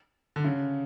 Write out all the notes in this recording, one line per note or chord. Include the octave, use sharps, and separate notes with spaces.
D3
C#3